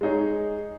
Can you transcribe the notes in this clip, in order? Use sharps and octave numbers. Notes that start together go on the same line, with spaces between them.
G#3 D#4 G#4 C#5